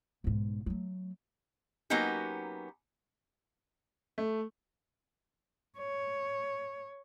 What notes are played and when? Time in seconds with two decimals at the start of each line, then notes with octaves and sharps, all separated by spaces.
0.24 B1 G#2
0.66 F#3 A3
1.90 F#3 A#3 B3 C#4 D#4 G4
4.18 A3
5.78 C#5